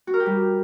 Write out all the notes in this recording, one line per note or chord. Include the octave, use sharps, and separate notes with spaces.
F#4
A#4
G4
G3